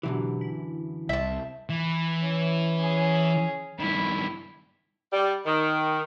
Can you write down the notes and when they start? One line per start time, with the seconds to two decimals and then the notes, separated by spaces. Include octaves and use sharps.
0.03 F#2 B2 D3 E3 F#3 G4
0.41 E4
1.09 C2 E5 A5
1.69 E3
2.20 C#4
2.79 C#4 G#4
3.79 G2 D#3 E4
5.13 G3
5.46 D#3